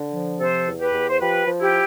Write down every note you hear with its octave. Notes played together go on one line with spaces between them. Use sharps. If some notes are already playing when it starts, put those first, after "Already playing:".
Already playing: D3
F3
C3 A4 C5
E2
G4 B4
E2
C5
F3 G4 B4
F3
E4 G4